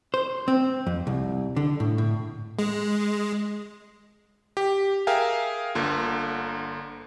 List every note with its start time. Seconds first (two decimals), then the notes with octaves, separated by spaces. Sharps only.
0.14 C5
0.48 C4
0.87 F2
1.07 C2
1.56 D3
1.80 A2
1.98 A2
2.59 G#3
4.57 G4
5.07 G#4 A#4 E5 F5 G5 G#5
5.75 G1 D3 A#3 F4